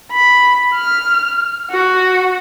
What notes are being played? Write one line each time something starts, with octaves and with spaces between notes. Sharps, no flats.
B5
F6
F#4